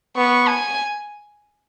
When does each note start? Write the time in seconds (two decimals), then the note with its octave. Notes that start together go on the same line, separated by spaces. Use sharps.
0.17 B3 C#6
0.47 G#5